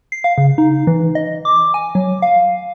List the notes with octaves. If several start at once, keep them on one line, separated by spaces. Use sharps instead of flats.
C7
F5
C#3
D#4
E3
D#5
D6
G#5
F#3
F5